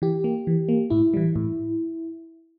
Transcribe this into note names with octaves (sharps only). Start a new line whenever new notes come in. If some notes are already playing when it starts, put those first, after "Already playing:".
E3 G4
A#3
E3
A#3
A2 E4
E3 G3
A2